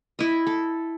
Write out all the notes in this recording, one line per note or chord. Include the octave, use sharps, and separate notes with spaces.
E4 D#5
A4